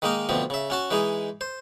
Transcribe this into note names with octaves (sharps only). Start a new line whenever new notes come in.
D#3 G#3 A#3 D#4 A#4
D2 B2 F3 C4
C#3 E5
C#4 F#4 A5
E3 G#3 D#4 G#4
C5